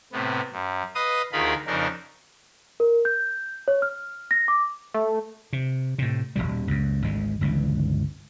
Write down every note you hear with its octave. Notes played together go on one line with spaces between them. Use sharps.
A2 C3 B3
F#2
B4 D#5 F5 D#6
D2 D#3 F4 G#4 A#4 B5
F2 C#3 D4 D#4 A#4
A#4
G6
C#5
F6
A#6
D6
A3
C3
A2 C3
D#1 C#2 B2 G3
C#2 F#2
G#1 D2 G#3
G1 C#2 G2 E3